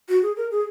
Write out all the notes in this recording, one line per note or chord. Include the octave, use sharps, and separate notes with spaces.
F#4
G#4
A#4
G#4